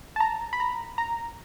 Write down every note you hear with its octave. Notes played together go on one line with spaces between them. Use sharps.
A5
A#5
B5
A#5
A#5